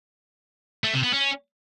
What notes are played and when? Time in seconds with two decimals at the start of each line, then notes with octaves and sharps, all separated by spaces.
0.84 A3
0.94 C3
1.03 B3
1.13 C#4